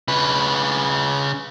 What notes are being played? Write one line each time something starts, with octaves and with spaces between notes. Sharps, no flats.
C#3 B4